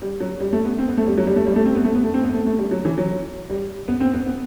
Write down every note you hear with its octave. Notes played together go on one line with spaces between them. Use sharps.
G3
F#3
G3
A3
B3
C4
B3
A3
G3
F#3
G3
A3
G3
A3
C4
B3
A3
B3
A3
C4
B3
A3
A3
G3
F#3
E3
F#3
G3
B3
C4
B3
B3